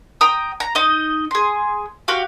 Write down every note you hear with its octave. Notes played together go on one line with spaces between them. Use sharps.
G5 A#5 D#6
A#5
D#4 D#5
G#4 C6
F#4 G4 F5